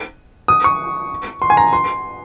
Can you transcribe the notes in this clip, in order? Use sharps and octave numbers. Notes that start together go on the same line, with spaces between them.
D#6
C#6
C6
G#5
A#5
C6